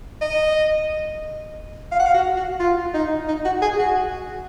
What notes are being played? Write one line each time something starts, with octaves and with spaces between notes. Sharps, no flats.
D#5
F5
F#5
F5
F#4
F#4
F4
D#4
D#4
F#4
G#4
F#4